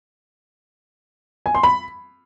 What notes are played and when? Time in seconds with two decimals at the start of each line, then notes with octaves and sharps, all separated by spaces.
1.46 G#5
1.55 C6
1.63 B5